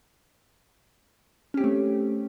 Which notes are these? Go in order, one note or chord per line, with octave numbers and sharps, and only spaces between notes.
A3 C4 C#4 G4